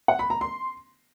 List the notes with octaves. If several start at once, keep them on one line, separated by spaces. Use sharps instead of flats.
F#5
B5
A#5
C6